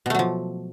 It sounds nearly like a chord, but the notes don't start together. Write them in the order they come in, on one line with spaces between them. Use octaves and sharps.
B2 A3 F#3 F3